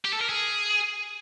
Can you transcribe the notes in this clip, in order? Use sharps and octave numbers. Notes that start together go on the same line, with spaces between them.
G4
A4
A#4
G#4